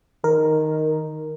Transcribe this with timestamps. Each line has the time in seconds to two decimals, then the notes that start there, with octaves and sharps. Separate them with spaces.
0.24 D#3 A#4